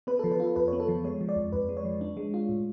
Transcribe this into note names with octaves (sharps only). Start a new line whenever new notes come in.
B3 B4
F3 A4
B4
F4 A4
F2 B4
B3 C#5
A4
F3
G#3 C#5
F3
D5
F2
F2 B4
G#3
C#5
F3
D4
G#3
F4
A2